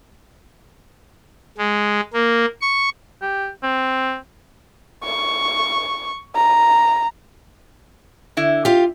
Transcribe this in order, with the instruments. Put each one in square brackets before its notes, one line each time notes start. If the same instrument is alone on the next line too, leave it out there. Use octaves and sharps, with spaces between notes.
[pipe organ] G#3
A#3
C#6
[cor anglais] G4
C4
[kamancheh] C#6
A#5
[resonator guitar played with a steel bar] D3 E4
[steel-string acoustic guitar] F4 F5 [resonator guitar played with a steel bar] G4